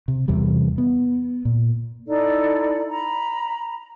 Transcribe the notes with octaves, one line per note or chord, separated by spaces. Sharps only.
C3
E2 C3 E3 G3
B3
A#2
D#4 E4 A4 D5
A#5 B5